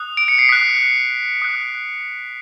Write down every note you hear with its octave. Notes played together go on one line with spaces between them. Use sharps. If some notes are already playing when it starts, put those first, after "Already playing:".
Already playing: D#6 F#6
D7
C#7
C7
D#6 F#6 B6
D#6 F#6